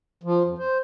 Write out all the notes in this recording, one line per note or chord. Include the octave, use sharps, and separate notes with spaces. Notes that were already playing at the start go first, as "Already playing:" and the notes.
F3
F2
C5